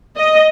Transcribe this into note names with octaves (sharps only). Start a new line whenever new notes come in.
D#5